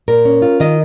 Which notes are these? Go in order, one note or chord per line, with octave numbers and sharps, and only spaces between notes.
A#2 A#4
C#4
F4
D#3 D#5